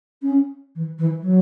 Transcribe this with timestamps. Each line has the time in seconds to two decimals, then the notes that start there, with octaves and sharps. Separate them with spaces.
0.22 C#4
0.75 E3
0.98 E3
1.22 F#3